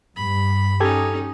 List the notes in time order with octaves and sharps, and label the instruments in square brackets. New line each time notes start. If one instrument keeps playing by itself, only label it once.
[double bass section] G2 [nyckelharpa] B5
[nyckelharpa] C#4 D#4 [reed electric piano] G4 A4 G#6